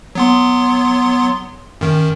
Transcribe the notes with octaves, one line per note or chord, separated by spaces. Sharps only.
F#3 B3 C6
F#2 D#3